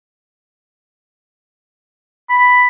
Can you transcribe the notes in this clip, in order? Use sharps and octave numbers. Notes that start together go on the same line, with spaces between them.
B5